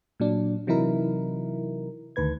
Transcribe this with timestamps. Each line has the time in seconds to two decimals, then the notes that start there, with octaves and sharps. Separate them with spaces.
0.20 A#2 F#3 D4
0.67 C3 E3 F#3 D#4 E4 A#4
2.16 D2 D#3 B4 G#6